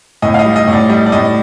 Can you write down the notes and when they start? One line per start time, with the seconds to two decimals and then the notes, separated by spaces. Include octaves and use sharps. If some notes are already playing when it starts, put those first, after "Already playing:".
0.22 A2 D#5
0.34 F5
0.39 D#5
0.45 G3
0.56 D#5
0.68 A2
0.73 D5
0.89 G3 D#5
1.06 D5
1.12 A2 D#5